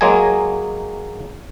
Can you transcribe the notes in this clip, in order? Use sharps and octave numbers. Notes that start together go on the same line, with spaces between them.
F#3 G#3 A#3 D#5 G#5